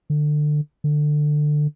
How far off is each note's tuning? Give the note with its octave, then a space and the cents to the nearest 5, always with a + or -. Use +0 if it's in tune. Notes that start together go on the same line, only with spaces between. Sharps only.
D3 +25
D3 +20